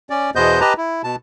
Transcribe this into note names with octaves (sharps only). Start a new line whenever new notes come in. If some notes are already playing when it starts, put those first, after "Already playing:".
C#4 D5
E2 B2 B3 C5 D#5 G6
G4 B4 D#5 A5 A#5
E4
B2 A5